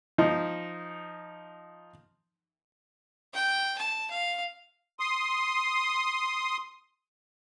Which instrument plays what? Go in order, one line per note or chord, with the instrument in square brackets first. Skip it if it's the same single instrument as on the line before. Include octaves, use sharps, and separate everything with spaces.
[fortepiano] F3 D#4
[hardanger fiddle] G5
A5
F5
[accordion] C6 D#6